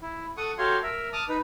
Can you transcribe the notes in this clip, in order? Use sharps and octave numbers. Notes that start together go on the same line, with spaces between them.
E4
A4 F#5 C#6 D#6
F#4 G4 A4 C#5 F5 C6
A#4 E5
A5 D6 D#6 F6
D#4 B4